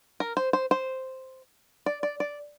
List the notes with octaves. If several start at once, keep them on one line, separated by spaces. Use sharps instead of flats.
A#4
C5
C5
C5
D5
D5
D5